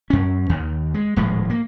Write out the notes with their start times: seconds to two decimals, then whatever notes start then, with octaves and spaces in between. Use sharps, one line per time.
0.10 F#2 C#4
0.49 D#2 D#3
0.94 G#3
1.16 D#1 A2 F3 G#3
1.50 A#3